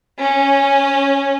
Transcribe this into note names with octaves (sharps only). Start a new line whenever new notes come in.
C#4